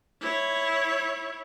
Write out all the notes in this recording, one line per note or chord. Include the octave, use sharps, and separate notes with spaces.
E4 C#5